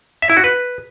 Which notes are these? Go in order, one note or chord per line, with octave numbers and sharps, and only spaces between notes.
E5
E4
F#4
B4